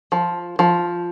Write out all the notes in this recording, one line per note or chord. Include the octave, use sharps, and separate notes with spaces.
F3
F3